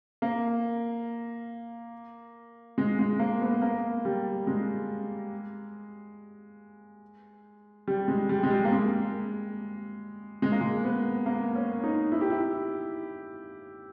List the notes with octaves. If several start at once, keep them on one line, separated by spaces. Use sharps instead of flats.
A#3
G#3
G#3
A#3
B3
A#3
G3
G#3
G3
G#3
G3
G#3
G3
A#3
G#3
G#3
A#3
G#3
B3
A#3
C#4
D#4
E4
G4
E4